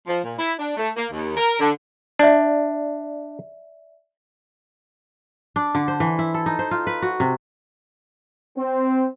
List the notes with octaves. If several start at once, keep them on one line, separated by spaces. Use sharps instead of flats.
F3
A#2
E4
D4
A3
A#3
D#2
A#4
D3
D4 D5 E5
D4
D3
C5
E3
E4
A4
D#4
C5
F4
B4
F#4
C3
C4